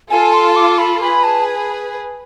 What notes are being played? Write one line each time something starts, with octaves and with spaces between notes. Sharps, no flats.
F4 A4 G#5
C6
D6
B5
G#4 B4 B5
A5